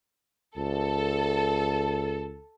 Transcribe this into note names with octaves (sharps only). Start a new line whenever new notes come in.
C#2 A4